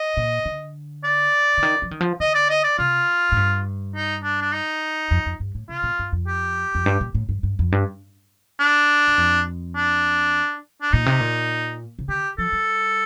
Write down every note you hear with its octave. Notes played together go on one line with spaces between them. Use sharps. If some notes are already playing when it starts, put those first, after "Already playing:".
Already playing: D#5
A#2
D3
D5
D3
D#3
F3
D#3
F3
D3 D#5
D5
D#5
D5
C3 F4
A2
G2
D#4
D4
D4
D#4
F2
F2
G2
A2
C3 F4
A#2
G2
F2
G4
F2
G2
A#2
A2
G2
G2
F2
G2
D4
G2
F2
D4
D4
A#2 D#4
C3
A#2
C3
D3 G4
F3 A4
G3